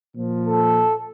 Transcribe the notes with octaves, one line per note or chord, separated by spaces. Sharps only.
A#2 F3
A4